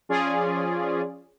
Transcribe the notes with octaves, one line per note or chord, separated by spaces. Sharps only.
F3 C#4 F4 G#4 D5